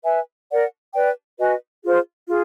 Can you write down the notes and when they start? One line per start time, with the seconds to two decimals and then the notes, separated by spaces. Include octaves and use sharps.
0.04 B4 E5 G#5
0.49 A#4 D5 F#5
0.94 B4 D5 G5
1.39 F#4 B4 D#5 G#5
1.82 F4 G#4 C5
2.27 F4 G#4